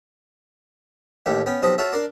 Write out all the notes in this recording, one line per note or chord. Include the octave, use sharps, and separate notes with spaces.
A1 D#2 A2 A3 G4
B3 C#4 G5
B1 F3 C4 G4 D#6
F4 F#4 A4 C#5 E5
D4 A#4 C6 D6